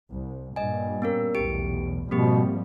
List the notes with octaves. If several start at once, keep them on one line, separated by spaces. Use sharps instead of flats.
C2
G2 A#2 G3 D#5 G#5
B3 C#4 A#4
B1 E2 A2 G4 D7
G#2 B2 F3 G3 A#3 C4 G4